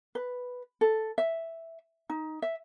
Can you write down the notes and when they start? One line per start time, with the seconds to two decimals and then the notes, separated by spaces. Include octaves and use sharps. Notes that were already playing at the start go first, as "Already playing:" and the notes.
0.15 B4
0.81 A4
1.18 E5
2.09 D#4
2.42 E5